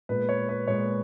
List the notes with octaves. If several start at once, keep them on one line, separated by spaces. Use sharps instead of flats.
A#2 G#3 B3 B4
C#5
B4
A#2 G#3 B3 C#5